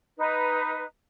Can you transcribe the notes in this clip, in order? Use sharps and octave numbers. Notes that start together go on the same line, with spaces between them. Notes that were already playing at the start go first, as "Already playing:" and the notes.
D#4 B4